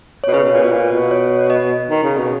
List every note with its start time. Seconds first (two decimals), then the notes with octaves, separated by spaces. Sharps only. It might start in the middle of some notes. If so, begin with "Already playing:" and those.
0.24 B2 C#5
0.33 C#3 B4
0.44 B2
0.52 A#2
0.62 B2
0.73 A#2
0.92 B2
1.11 C#5
1.50 D#5
1.89 D#3
2.03 C#3
2.18 B2